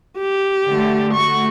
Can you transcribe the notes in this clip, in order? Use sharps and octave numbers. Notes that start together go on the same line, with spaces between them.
G4
D3 A3
A3 F#4 C#6